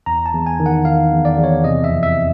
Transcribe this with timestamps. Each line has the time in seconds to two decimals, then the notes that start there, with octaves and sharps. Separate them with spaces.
0.06 E2 A#5
0.26 A5
0.33 E2
0.46 G#5
0.60 D#3
0.66 F#5
0.85 D#3 F5
1.11 E2
1.25 D5
1.37 E2
1.44 C#5
1.64 C3 D#5
1.84 E5
1.89 F2
2.03 E5